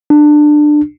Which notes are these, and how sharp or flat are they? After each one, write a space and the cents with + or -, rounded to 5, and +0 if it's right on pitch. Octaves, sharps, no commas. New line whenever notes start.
D4 +20